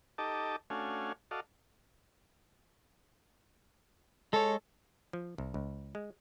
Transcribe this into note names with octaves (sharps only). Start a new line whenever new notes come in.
D#4 G4 A4 D#5 A5 D6
A3 C#4 D4 F#4 F5 G#5
F#4 A4 D5 D#5 F5
G#3 A4 C#5
F3
C2
C#2
G#3